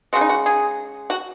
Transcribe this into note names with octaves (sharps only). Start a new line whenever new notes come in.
C#3 G#3 F#4
D#4
F#4
G#4
F#4